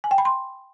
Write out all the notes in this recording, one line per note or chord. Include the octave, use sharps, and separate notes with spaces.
G#5
G5
B5
C6